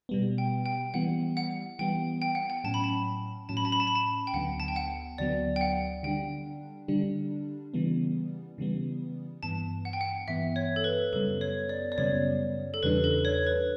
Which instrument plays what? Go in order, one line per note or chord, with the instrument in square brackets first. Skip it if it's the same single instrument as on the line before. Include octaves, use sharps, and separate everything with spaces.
[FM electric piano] B2 G3 B3
[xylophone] G5
G5
[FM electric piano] E3 G3 B3 [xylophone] F#5
[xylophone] F#5
[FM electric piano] E3 G3 B3 [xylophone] G5
[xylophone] G5
F#5
G5
[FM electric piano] A2 F#3 C#4 [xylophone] A5
[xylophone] B5
A5
[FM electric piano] A2 F#3 C#4 [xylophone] A5
[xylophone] B5
A5
B5
A5
B5
A5
G5
[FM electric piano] D2 D3 F#3 B3 [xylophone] F#5
[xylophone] A5
G5
F#5
[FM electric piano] D2 D3 F#3 B3 [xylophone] D5
[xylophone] G5
F#5
[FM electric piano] D3 G3 D4 [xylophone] G5
[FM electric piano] D3 G3 D4
C#3 E3 G3 B3
C#3 E3 G3 B3
[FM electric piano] G2 E3 B3 [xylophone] A5
[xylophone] F#5
G5
F#5
[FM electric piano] G2 E3 B3 [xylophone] E5
[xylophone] C#5
A4
B4
[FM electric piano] F#2 C#3 G3 B3 [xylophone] A4
[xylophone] C#5
D5
D5
[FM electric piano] F#2 C#3 G3 B3 [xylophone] C#5
[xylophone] A4
[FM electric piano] E2 C#3 E3 G3 D4 [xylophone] B4
[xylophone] A4
B4
C#5
B4